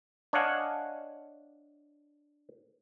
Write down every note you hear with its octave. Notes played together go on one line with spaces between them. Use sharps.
D4 C#5 D#5 F5 F#5 G#5